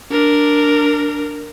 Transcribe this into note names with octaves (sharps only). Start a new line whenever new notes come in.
D4 A#4